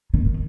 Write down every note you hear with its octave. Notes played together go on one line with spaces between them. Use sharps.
D#3